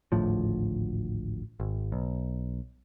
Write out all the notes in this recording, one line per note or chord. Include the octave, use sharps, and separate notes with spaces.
G#1 D2 A2 F3
G#1
B1